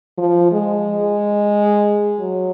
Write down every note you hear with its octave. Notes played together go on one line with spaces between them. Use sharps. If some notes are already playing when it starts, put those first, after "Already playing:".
F3
G#3
F#3